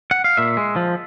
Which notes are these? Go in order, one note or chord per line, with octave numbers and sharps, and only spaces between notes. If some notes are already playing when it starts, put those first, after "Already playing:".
F#5
F5
A#2 E5
G#3
F3